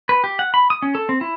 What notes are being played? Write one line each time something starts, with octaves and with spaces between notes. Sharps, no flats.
B4
G4
F#5
B5
D#6
C#4
A4
C4
E4